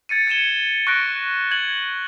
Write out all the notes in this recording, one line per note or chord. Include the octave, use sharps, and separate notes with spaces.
G#6 A6 C#7 D#7
G#6 C#7 D#7 E7 G7
C#6 F#6 A#6 D7
G#6 F#7